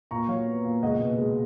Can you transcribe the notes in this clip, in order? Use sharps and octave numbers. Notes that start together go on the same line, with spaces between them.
A#2 A#5 C#6
F#3 C#5 F5
B3
A#2
C#2 D#5 F#5
B2
G#3